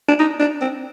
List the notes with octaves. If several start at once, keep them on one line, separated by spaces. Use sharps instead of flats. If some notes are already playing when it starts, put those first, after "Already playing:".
D4
D#4
D4
C4